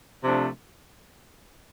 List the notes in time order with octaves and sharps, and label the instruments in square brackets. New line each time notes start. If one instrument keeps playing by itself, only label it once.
[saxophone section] C3 F3 A3 D4